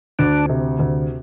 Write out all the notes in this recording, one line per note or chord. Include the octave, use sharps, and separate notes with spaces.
D2 D4
C3
D2